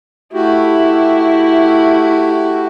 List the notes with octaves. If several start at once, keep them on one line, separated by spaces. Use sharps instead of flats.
A3 E4 F#4 G4